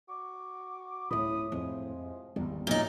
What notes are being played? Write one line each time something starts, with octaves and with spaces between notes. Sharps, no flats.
F#4 C#6 D6
D1 A2 C#3 E4 B5 D#6
F2 C3 F3 G#3
G#1 E2 G3 B3
F#2 A#2 D#4